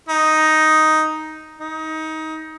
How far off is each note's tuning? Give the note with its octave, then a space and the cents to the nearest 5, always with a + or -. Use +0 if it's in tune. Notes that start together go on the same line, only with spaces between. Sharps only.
D#4 +5
D#4 +20